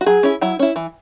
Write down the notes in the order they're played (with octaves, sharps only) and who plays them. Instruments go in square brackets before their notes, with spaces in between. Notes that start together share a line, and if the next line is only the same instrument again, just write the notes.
[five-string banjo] F#4
F#3 G#4
C#4 E4
F#3 E4
C#4 E4
E3